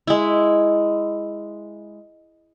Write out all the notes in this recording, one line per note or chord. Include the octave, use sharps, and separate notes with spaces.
G#3 E4